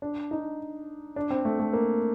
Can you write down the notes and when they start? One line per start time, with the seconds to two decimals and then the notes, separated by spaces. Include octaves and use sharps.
0.02 D4
0.31 D#4
1.16 D4
1.31 C4
1.45 A3
1.60 A3
1.73 A#3